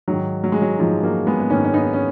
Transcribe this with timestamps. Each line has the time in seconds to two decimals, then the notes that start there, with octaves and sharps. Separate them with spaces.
0.08 G#2 D#3 F#3
0.44 F#3
0.52 G#3
0.62 F#3
0.79 G#2 D#3 F3 G#3
1.03 F#3 A#3
1.27 G#3 B3
1.40 B3
1.50 G#2 D#3 A#3 C#4
1.65 C#4
1.74 B3 D#4
1.93 C#4